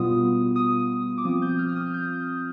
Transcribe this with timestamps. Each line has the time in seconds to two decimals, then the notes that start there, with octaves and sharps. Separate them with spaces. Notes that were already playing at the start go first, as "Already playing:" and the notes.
Already playing: B2 G3 B3 F4 D#6
0.56 D#6
1.18 D6
1.25 F3 C4 F4 D#6
1.42 G6
1.59 F6
1.69 F6
1.76 D#6
1.94 G6